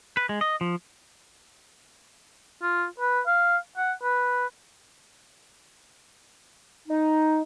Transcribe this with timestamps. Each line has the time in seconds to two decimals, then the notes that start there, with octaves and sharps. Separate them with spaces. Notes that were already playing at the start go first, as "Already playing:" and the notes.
0.17 B4
0.29 G#3
0.41 D#5
0.61 F3
2.62 F4
3.00 B4
3.27 F5
3.77 F#5
4.03 B4
6.88 D#4